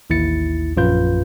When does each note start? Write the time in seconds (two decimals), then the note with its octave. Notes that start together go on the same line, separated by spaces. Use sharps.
0.10 A1 D#2 E4 A6 C#7
0.77 A#1 F#2 F4 B4 G6